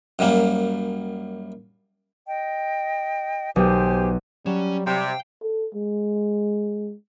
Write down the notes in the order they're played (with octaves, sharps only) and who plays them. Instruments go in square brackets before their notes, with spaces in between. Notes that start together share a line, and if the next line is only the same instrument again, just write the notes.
[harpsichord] F#2 F#3 G3 A#3
[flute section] D#5 G5
[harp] B1 [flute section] G4 C5 G#5
[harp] F#3 E7 [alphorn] G3 [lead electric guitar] C#4
[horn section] C3 [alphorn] G3 [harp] F5 E7 [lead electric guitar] G5
[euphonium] A4
G#3